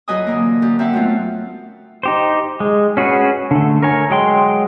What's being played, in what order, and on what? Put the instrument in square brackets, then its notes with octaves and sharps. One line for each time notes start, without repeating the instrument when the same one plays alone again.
[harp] F2 F#3 B4 D#5 G#5 D#6
D3 E3 A#3
F#2
F#2 C4 E5 F#5 A5
F#3 A3 B3 C#4 F4
[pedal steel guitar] D#4 G4 C5
G#3
C#4 F#4 G#4 B4
D3 A3
A#4 C#5 G#5
F#3 G#3 G5 C6